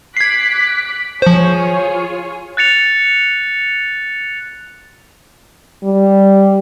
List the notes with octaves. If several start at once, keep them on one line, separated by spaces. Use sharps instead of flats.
D6 F#6 G#6 B6 C7
F3 F4 G#4 C5 C#5
F#6 A6 C#7 F7
G3